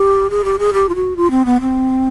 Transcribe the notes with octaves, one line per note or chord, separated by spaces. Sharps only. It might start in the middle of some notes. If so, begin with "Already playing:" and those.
Already playing: G4
G#4
G4
G#4
G4
F4
F#4
F4
C4
B3
C4